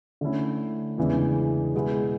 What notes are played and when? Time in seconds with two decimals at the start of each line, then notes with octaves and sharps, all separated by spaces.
0.21 D3 A3 C#4 E4
0.98 E2 C#3 E3 G#3 D4
1.75 B2 G#3 B3 E4